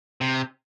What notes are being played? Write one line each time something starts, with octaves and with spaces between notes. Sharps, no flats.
C3